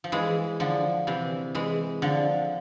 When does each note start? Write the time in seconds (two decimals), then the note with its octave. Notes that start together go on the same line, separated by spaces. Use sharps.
0.04 F3
0.12 E3 G#3
0.60 D3 F3
1.07 C3 E3
1.55 E3 G#3
2.02 D3 F3